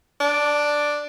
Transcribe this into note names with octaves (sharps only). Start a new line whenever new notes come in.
D4